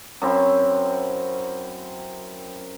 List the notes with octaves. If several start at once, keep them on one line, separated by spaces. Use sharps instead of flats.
F#2 C4 E4